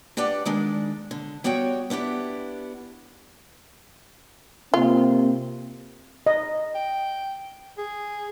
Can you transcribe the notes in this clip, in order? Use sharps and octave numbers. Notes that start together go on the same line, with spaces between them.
D4 G4 B4 D5 F#5
D#3 G#3 D4
D3
G3 B3 F#4 C#5 G5
B3 D4 E4 G4
C3 A#3 C4 F4
D#5
G5
G#4